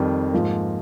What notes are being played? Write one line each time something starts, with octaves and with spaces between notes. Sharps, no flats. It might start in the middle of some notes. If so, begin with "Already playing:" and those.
Already playing: F2 D#3 G3
G#2 F3 A#3